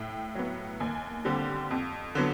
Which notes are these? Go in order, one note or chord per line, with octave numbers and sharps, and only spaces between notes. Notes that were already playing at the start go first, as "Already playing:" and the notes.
Already playing: A2 G5
F#3 B3
D#2 G#5
D3 G3 C4
F2
D3 F#3 B3